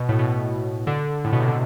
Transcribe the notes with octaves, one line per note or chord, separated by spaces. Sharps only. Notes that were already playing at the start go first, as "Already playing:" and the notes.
Already playing: B2
A2
B2
D3
A2
B2
C3
D3